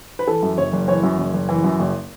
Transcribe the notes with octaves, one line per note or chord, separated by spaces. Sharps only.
B4
E3 A4
F#2
F#1 C#5
F#1
E3 C#5
F#2
F#1
F#1
E3
F#2
F#1